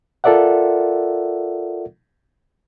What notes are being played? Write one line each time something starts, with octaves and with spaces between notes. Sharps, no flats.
F4 A4 A#4 D5 E5 F#5